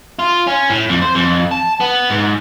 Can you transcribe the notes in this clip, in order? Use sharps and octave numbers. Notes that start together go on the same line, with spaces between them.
F4
C#4
A2
F2
C5
F2
A5
B3
G#2